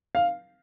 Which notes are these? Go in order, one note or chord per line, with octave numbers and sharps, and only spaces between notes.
F5